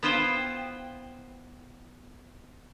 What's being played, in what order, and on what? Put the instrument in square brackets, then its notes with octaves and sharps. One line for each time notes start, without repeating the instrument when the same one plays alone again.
[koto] B3 E4 F4 B4 C5 G5